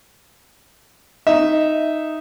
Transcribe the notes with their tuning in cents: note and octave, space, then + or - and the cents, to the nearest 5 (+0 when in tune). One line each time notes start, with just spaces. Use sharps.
D#4 +0 E5 +0